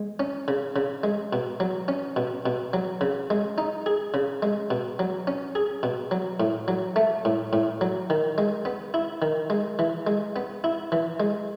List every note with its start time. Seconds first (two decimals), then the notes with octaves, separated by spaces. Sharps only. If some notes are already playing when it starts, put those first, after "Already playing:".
Already playing: G#3
0.20 C#4
0.48 C#3
0.76 C#3
1.03 G#3
1.33 B2
1.60 F#3
1.88 C#4
2.16 B2
2.46 B2
2.73 F#3
3.01 C#3
3.30 G#3
3.58 D#4
3.86 G#4
4.14 C#3
4.42 G#3
4.70 B2
4.99 F#3
5.27 C#4
5.55 G#4
5.83 B2
6.11 F#3
6.40 A2
6.68 F#3
6.96 A3
7.25 A2
7.53 A2
7.81 F#3
8.10 D#3
8.38 G#3
8.65 B3
8.94 E4
9.22 D#3
9.50 G#3
9.79 E3
10.07 G#3
10.36 B3
10.64 E4
10.92 E3
11.20 G#3